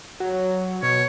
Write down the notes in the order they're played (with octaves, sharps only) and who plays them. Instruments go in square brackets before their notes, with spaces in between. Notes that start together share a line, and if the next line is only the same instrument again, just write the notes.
[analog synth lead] F#3
[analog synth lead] B2 [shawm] C#5